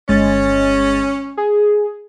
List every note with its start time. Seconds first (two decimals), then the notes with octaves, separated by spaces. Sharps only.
0.09 G1 G#3 C#4 A6
1.37 G#4